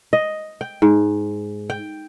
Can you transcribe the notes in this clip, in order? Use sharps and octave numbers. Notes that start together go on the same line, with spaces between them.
D#5
G5
G#2
G5